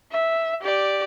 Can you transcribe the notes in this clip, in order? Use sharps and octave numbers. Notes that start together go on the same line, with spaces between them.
E5
G4 D5